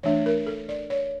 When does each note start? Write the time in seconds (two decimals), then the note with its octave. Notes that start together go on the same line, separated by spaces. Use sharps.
0.03 E3 A3 D4 C#5
0.26 A#4
0.47 A4
0.69 D5
0.90 C#5